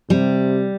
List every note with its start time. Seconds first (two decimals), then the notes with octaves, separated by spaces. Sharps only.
0.10 C3 G3